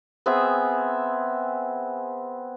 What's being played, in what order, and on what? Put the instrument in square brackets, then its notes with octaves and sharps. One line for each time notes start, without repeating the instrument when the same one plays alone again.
[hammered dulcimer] B3 C4 G#4 E5